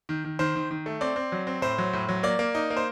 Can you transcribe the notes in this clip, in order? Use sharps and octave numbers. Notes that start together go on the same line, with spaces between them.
D#3
D#3
D#3 C5
D#3
D#3
A3
C4 D5
C4
F#3
C4
A2 C5
F#3
A2
F#3
A#3 D5
A#3
D#4
A#3
C5